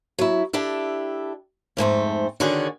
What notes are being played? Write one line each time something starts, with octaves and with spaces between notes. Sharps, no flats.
F#3 E4
D4 E4 G4 A4
F2 G#2 A3 C4
D3 D#3 C#4 F#4 G#4 D5